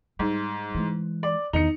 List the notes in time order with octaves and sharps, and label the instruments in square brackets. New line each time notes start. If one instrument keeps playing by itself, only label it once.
[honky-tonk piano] G#2 [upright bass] G3
[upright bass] E3 G#3
[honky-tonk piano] D5
[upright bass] E2 D#3 [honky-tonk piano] D#4 C#7